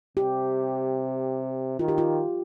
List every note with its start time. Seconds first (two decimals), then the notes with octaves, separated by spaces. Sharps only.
0.17 C3 G4
1.79 D#3 F4
1.88 G4
1.98 F4